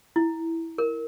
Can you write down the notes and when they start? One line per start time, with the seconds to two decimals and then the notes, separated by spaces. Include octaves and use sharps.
0.16 E4
0.78 A#4